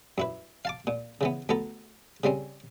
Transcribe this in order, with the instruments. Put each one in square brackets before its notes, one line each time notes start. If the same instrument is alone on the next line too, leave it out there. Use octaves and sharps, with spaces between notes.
[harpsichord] F#2 E4 B4
F5 A5 D6
A#2
C#3 E3 B3
D2 B3 A4 A#5
C#3 G3 C4 C#4